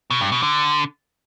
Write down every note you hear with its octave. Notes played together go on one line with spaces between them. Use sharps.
B2
G2
B2
D3